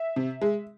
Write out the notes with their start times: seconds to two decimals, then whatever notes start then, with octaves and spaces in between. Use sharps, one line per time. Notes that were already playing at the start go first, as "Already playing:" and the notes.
Already playing: E5
0.16 C3
0.42 G#3